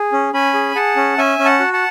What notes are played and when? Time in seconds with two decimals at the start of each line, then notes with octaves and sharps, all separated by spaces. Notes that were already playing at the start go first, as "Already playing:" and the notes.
Already playing: G#4
0.12 C#4
0.33 C#4 G#5 B5
0.54 G#4
0.75 G#4 F#5 A5
0.96 C#4
1.18 C#4 E5 G#5
1.39 C#4
1.45 F#5 A5
1.60 F#4
1.73 F#5 A5